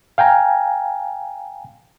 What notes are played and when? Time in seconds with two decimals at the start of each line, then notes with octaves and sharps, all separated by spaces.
0.18 F5 G5 G#5 A#5